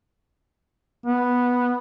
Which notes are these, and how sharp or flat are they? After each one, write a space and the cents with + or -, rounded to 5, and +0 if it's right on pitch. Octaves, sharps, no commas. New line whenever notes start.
B3 -5